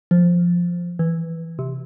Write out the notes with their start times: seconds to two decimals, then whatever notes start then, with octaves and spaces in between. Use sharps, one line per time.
0.11 F3
0.99 E3
1.59 C3